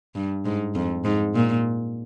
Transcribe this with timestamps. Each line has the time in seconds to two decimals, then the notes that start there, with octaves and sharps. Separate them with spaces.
0.15 G2
0.45 G#2
0.75 F2
1.05 G#2
1.35 A#2